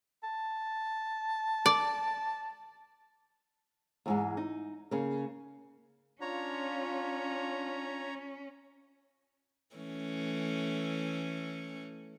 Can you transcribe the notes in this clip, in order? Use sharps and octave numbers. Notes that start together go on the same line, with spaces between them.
A5
D5
E2 G#2 G#3
D#4
C#3 A#3
C#4 D4 F4 C#5 A#5
E3 A3 C#4